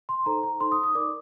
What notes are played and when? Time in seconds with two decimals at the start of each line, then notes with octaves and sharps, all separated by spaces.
0.09 C6
0.26 D#4 A4 C5 A#5
0.43 A#5
0.60 D#4 A4 C5 C6
0.72 D#6
0.84 D#6
0.95 D#4 A#4 D5 D6